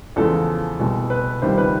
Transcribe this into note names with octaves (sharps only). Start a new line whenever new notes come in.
E2 C#3 F3 G#3 A4
C2 B2 G#3
B4
C#2 C3 D#3 G3 C5
B4